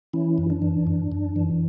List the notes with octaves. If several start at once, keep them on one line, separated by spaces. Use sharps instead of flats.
E3 C#4 E4
F#2
D4
E3
F#2
F#2
E3